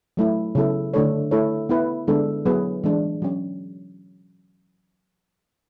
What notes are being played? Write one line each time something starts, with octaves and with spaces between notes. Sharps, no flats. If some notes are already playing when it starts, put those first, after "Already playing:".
F#3 A3 E4
C#3 F#3 B3 E4 A4
D3 A3 D4 A4 C#5
A3 E4 A4 C#5
B3 E4 B4
D3 G#3 B3 D4 A4
F#3 B3 E4 G#4 B4
E3 G#3 D4
F#3 C#4